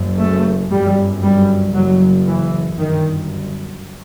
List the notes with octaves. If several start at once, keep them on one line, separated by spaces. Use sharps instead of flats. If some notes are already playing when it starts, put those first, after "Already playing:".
Already playing: F#1 F#2
A3
G1 F#2 G3
G3
F#1 F#2 F#3
E3
G1 F#2 D#3